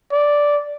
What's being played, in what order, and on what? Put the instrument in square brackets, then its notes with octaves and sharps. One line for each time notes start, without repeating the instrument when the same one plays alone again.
[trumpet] D5